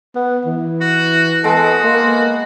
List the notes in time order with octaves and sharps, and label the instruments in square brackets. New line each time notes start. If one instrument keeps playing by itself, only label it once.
[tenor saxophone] B3
E3
[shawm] F#4
[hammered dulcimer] G#3 B3 [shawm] F#4 [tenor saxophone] A4
[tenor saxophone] A#3